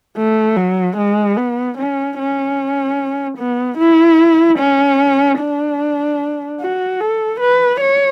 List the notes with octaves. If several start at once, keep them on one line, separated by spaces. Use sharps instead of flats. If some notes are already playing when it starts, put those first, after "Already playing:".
A3
F#3
G#3
B3
C#4
C#4
B3
E4
C#4
D4
F#4
A4
B4
C#5